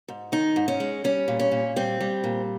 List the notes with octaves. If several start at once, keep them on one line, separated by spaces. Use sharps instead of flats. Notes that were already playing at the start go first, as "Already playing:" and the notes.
G#2
D#3 D#4
G#2
C#4
G#3
G3 C#4
A#2
C#4
A#2
G3 C4
G3
A#2